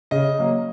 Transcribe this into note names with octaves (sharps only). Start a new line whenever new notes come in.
C#3 D#5
F#3 A#3